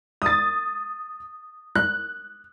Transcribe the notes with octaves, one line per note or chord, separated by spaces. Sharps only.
D#6 A6
F#6